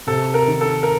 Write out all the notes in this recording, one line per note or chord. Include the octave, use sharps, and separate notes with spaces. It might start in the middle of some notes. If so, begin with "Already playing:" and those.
C3 A4
A#4
D#3
A4
A#4